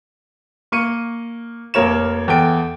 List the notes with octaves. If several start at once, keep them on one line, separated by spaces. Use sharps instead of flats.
A#3 C#6 C#7 D#7
F1 A#3 A#4 C#5 E7
E2 A4 G5 D7